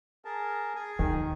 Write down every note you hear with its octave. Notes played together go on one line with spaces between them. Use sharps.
G#4 A#4 A5
G#4 G#5
D#2 D#3